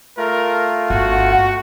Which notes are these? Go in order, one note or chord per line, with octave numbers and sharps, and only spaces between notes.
A3 F4 A#4
G1 F#4 F#5